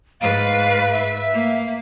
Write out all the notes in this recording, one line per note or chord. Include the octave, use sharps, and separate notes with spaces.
G#2 B4 F5
E5
A#3